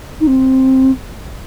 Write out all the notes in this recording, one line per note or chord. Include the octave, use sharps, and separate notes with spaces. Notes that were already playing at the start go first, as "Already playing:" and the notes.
D#4
C4